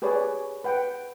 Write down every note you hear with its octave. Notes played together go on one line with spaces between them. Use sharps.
G4 G#4 B4 C#5 D5 G#5
B4 F#5 G5